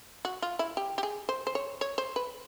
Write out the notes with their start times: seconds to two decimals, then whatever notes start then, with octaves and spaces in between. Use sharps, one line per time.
0.25 F#4
0.42 F4
0.59 E4
0.77 G4
0.98 G4
1.03 G#4
1.29 C5
1.47 C5
1.55 C#5
1.81 C#5
1.98 C5
2.16 B4